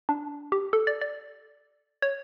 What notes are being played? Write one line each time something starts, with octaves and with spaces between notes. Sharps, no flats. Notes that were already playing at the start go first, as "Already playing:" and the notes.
D4
G4
A4
D5
D5
C#5